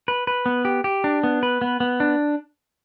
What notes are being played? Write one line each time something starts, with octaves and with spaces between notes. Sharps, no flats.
B4
B4
B3
G4
G4
D4
B3
B4
B3
B3
D4